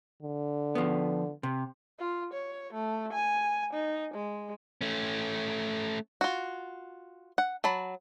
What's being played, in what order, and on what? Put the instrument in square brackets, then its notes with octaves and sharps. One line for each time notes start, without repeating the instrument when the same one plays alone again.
[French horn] D3
[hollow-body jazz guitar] F3 B3
C3
[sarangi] F4
C#5
A3
G#5
D#4
G#3
[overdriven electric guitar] A3 C#4
[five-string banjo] F4 F#4
F#5
F#3 A5 B5